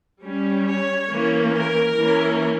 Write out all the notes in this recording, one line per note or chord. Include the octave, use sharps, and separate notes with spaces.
G3 C#4
C#5
E3 A#3 C#4
A#4
E3 A#3 C#4